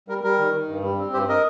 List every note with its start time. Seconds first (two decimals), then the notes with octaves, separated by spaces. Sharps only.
0.08 G3 A#4
0.24 G3 A#4
0.39 D#3
0.54 D#3
0.68 G2
0.83 G3
0.99 C4
1.13 G2 G4 C5
1.29 A#4 D#5